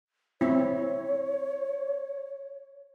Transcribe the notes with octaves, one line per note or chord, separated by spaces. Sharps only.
C4 E4 C#5